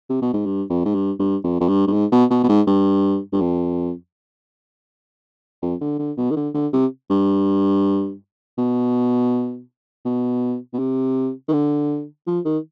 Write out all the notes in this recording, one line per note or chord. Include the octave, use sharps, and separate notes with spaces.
C3
B2
G#2
G2
F2
G#2
G2
G2
F2
F2
G2
G2
G#2
B2
B2
B2
G#2
G2
G2
F2
F2
D3
D3
B2
D#3
D3
D3
C3
G2
B2
B2
B2
C3
D#3
D3
F3
D#3